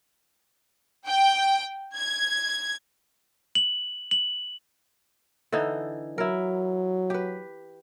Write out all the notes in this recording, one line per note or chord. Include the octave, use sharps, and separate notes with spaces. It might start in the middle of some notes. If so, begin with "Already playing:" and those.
G5
G#6
F#7
F#7
D3 E3 D#4
F#3 E4 A#4
G4 B4